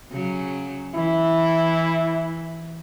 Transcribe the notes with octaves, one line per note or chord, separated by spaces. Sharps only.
C#3 F#3
E3 E4